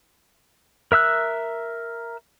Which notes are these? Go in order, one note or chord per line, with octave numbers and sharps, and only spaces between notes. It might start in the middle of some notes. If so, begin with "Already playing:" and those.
A#4 E5 E6 F#6